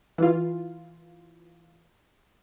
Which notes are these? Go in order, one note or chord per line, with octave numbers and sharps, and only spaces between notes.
E3 F4